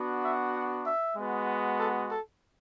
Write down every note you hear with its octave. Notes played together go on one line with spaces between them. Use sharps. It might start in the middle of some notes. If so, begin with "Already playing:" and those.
Already playing: B3 D4 F#4
E5
F#5
E5
G#3 B3 F#4
A4
A4